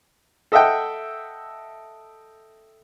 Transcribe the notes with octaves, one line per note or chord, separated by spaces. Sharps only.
A4 D#5 E5 F#5 G5